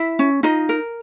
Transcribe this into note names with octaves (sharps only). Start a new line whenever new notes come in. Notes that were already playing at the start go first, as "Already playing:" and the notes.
Already playing: E4 E5
C#4
D#4 F4 D#5
A#4